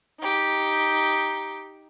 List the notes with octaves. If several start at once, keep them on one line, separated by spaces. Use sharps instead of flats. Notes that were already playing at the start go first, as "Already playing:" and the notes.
D#4 G4